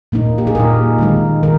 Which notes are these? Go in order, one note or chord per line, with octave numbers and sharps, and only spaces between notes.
A#2 A#3 D#4
G4
G#4
A#2 A#3 D#4 A#4
D#3 G#3 D#4
D#3 A#4